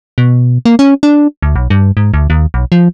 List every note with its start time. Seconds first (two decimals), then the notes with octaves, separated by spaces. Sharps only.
0.18 B2
0.65 A#3
0.79 C#4
1.03 D4
1.43 D2
1.56 B1
1.70 G2
1.97 G#2
2.14 D2
2.30 D#2
2.54 B1
2.72 F3